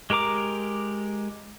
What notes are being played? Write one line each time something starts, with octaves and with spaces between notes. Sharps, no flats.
G#3 G4 A#4 A#5 D6